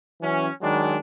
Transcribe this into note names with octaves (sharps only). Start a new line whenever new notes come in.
E3 F#3 C#4
D#3 F#3 G#3 D4